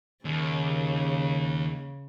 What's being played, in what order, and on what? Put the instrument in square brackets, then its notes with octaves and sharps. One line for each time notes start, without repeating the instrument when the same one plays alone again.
[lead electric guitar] D#2 [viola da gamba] C#3